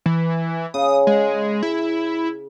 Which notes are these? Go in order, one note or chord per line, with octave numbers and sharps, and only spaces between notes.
E3
C#3 D#6
G#3
E4